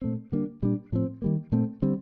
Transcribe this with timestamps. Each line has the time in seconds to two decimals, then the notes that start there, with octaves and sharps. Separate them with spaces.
0.02 A#2 A3 C4
0.32 D3 G3 A#3 D4
0.62 A#2 G3 D4
0.92 A2 F3 C4
1.22 D#3 G3 A#3
1.52 A#2 A3 C4
1.82 D3 G3 C4